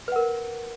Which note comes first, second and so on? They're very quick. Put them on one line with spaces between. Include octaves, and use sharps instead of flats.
B4 F#5 A#4